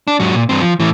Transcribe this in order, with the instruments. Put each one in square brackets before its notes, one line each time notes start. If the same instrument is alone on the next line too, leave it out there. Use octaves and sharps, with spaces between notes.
[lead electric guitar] D4
G#2 F#3
A#2
G2 C4
F3
A2 E3